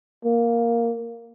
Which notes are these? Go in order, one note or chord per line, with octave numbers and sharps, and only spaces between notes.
A#3